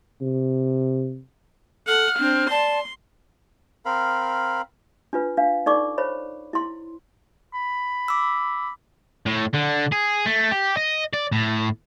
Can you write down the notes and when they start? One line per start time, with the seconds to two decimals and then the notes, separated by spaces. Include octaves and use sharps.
0.21 C3
1.87 A4 F#5 F6
2.20 C4 D4
2.50 D5 A5 C6
3.85 C4 A#4 F5 B5
5.13 D4 F4 B4
5.37 D4 F5
5.66 D#4 A4 D5 C#6 D6
5.98 C5 C#5 B5
6.53 E4 C6
7.54 B5
8.08 D6 E6
9.26 A2
9.53 D3
9.92 G#4
10.26 A3
10.51 G4
10.77 D#5
11.13 D5
11.32 A2